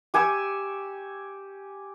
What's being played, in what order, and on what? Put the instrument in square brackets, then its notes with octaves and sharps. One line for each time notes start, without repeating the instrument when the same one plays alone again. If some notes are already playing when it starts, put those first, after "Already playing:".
[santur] G4 G#5 C#6 E6